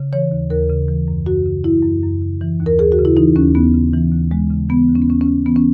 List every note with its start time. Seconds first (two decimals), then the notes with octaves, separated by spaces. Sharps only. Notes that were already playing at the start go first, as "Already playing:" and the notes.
Already playing: C#3
0.13 E3 C#5
0.31 D#2
0.50 D#2 A#4
0.69 C#3
0.89 E3
1.08 F#2
1.26 F#2 F#4
1.46 C#3
1.64 E3 E4
1.83 F#2
2.03 F#2
2.22 C#3
2.41 E3
2.60 D#2
2.66 A#4
2.79 D#2 G#4
2.92 F#4
2.99 C#3
3.05 E4
3.17 E3 D#4
3.36 D#2 C#4
3.55 D#2 B3
3.74 C#3
3.93 E3
4.12 D#2
4.31 D#2 G#3
4.50 C#3
4.69 E3 B3
4.89 D#2
4.95 C#4
5.02 B3
5.08 D#2 C#4
5.21 C#4
5.26 C#3
5.46 E3 B3
5.56 C#4